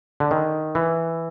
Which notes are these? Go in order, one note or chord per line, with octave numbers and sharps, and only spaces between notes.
D3
D#3
E3